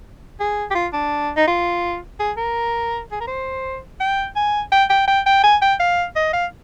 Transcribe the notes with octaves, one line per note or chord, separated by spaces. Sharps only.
G#4
G4
F4
D4
D#4
F4
G#4
A#4
G#4
A#4
C5
G5
G#5
G5
G5
G5
G5
G#5
G5
F5
D#5
F5